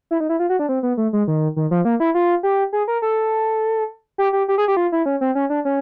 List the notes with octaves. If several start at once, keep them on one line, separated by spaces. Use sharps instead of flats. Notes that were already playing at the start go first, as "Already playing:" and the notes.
E4
D#4
E4
F4
F#4
D4
C4
B3
A3
G#3
D#3
D#3
F3
A#3
E4
F4
G4
G#4
A#4
A4
G4
G4
G4
G#4
G4
F4
E4
C#4
C4
C#4
D4
C#4